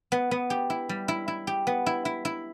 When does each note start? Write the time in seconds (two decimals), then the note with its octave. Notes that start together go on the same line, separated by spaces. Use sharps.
0.12 B3
0.31 B3
0.50 G4
0.70 E4
0.89 G3
1.08 E4
1.28 E4
1.47 G4
1.67 B3
1.86 E4
2.05 E4
2.25 E4